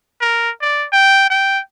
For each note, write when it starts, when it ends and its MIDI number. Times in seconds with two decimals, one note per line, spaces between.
0.21 0.50 70
0.62 0.86 74
0.92 1.28 79
1.30 1.60 79